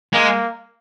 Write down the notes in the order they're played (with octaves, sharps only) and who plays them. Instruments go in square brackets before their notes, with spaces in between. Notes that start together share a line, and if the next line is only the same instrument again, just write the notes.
[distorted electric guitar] G#3 [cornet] A#3